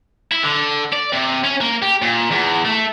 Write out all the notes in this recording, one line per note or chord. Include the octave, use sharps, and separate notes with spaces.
E4
D3
D5
C3
C#4
A#3
G4
A#2
E2
A3